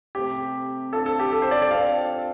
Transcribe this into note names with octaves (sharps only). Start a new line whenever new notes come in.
C3 A3 C4 G4
F3 D4 F4 A4
A4
G4
A4
C5
D5
D5
F3 C4 A4 F5